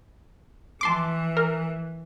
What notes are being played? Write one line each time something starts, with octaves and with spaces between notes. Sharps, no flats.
E3 A5 C6 D6
A#4